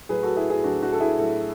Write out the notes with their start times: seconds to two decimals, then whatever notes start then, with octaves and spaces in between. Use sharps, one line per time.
0.09 A2 F#3 G#4 B4
0.23 F#4 A4
0.37 E4 G#4
0.50 E4 G#4
0.64 A2 F#3 D4 F#4
0.82 D4 F#4
0.92 A4
1.00 E4 G#4
1.18 A2 F#3